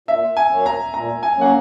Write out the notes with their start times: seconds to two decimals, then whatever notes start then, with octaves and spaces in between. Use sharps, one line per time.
0.08 A#2 E5
0.37 G#5
0.51 F#3 A#3 C#4
0.66 A#5
0.94 A#2 A#5
1.23 G#5
1.37 F#3 A#3 C#4 F#5